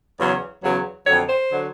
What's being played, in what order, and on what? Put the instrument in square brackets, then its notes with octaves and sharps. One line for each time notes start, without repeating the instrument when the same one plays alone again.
[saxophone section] E2 C#3 F#3
E2 C#3 F#3
F2 D3 F#3 C#5
C5
D3 F#3